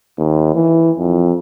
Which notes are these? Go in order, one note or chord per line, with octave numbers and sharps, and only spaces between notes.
D#2
E3
F2